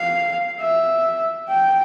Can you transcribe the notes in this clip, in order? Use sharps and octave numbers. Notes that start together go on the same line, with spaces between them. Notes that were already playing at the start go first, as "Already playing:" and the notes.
Already playing: F5
E5
G5